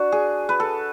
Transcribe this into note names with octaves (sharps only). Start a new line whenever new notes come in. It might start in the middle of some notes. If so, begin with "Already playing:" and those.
Already playing: D4 F#4
G#4
B4
A4